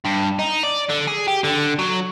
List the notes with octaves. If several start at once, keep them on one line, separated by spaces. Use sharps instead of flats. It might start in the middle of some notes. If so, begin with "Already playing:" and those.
G2
D#4
D5
D3
G#4
G4
D3
F#3